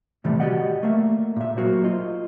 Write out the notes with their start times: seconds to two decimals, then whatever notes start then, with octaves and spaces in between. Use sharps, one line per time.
0.24 A2 C3 D#3 E3 G3 A3
0.40 F#4 G4 B4 D5 D#5 F#5
0.83 A3 A#3 E5
1.36 A#2 E5
1.57 F#3 A#3 F#4 C5
1.84 F4 D#5